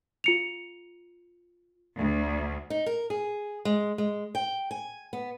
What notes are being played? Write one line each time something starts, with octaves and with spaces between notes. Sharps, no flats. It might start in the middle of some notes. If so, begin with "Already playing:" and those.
F4 C#7 F7
D2
D#4
A#4
G#4
G#3
G#3
G5
G#5
B3